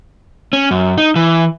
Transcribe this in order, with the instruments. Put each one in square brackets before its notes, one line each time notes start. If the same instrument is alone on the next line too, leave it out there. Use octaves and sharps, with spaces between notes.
[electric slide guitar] C#4
F#2
D#4
E3